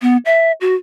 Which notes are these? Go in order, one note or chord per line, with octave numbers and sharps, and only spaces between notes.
B3
E5
F#4